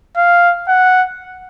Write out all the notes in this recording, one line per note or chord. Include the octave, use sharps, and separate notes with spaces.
F5
F#5